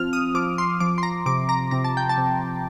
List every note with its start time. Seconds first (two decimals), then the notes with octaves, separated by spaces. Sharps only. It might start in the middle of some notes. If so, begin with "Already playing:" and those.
Already playing: F3 C4 F6
0.13 D#6
0.35 F3 D6
0.58 C6
0.80 F3 D6
0.98 C6
1.03 A#5
1.26 C3 D6
1.49 A#5
1.71 C3 A#5
1.84 A5
1.97 G5
2.09 A5
2.18 C3